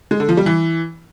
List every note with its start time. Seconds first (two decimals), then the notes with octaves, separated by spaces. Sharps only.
0.11 G#3
0.20 D3
0.29 F3
0.37 G3
0.46 E3